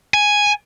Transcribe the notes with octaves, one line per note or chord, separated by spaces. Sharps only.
G#5